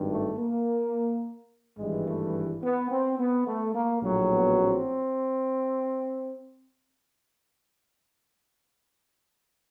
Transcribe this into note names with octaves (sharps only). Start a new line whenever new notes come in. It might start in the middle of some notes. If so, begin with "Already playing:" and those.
Already playing: G#1 G2 D#3
A3
A#3
G#1 G2 E3 G3 G#3
A3
B3
C4
B3
A3
A#3
A#1 A2 F#3
B3
C4